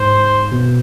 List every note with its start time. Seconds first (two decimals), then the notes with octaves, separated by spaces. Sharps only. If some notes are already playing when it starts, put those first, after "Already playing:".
Already playing: G#2 C5
0.52 B2